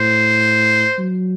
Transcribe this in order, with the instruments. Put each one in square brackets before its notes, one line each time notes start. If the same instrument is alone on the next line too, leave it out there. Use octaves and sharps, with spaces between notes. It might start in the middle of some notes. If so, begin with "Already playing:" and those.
Already playing: [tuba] A2 [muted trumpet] C5
[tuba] F#3